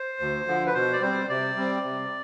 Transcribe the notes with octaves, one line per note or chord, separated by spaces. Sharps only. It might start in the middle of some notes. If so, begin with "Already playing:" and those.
Already playing: C5
D2
D3 F3
B4
B2 C5
D5
G3 C4 C5
C3 D5
G3 C4
C3